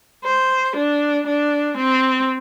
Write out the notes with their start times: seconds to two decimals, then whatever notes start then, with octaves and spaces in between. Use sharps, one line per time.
0.25 C5
0.76 D4
1.27 D4
1.77 C4